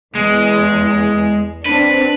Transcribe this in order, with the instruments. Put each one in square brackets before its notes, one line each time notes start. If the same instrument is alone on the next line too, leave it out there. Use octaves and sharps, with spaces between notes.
[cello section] E2 [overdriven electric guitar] G#3
[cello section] C4 D4 [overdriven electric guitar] B4